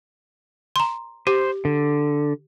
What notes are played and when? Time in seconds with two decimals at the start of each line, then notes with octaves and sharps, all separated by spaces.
0.76 A#5 C6
1.27 G4 C5
1.65 D3